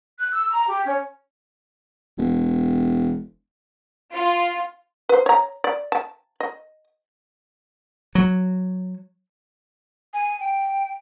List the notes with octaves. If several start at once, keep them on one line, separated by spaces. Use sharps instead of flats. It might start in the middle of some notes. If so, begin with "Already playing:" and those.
F#6
E6
A#5
G4
C#4
E1
F4
B4 C5
C#5 A#5
D5
A5
D#5
F#3
G#5
G5